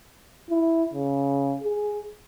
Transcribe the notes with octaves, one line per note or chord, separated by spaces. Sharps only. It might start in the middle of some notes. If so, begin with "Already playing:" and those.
E4
C#3
G#4